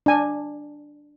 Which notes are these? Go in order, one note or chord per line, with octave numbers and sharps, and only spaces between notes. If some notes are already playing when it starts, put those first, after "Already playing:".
D4 G#5